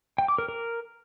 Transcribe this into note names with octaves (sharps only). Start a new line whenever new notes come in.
G5
D6
A#4
A#4